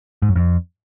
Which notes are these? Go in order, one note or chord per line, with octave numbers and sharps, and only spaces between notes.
G#2
F#2
F2